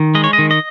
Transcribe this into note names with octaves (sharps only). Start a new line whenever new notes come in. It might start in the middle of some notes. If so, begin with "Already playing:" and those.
Already playing: D#3
G#3 D#5
C#5
D#5
D#3
D#5